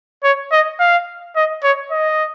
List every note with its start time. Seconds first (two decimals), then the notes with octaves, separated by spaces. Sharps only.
0.24 C#5
0.52 D#5
0.80 F5
1.36 D#5
1.63 C#5
1.91 D#5